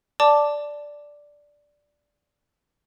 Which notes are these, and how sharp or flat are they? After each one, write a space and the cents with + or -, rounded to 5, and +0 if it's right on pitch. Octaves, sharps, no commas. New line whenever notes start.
D5 +0 A5 +0 D6 +0